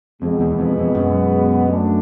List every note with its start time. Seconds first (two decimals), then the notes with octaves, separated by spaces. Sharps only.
0.21 F2 B2 G#3 B3
0.40 E2
0.59 F2
0.78 F2
0.95 F#2
1.69 F#3 A3 D4